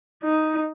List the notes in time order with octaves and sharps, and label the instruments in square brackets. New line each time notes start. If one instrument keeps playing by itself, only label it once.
[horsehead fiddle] D#4